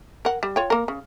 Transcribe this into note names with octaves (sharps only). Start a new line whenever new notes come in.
A#4 F#5
G3
F4 C#5 G5
A#3 A#4
C#3